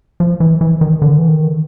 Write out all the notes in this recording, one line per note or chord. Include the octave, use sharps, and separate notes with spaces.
F3
E3
E3
D#3
D3
E3
D#3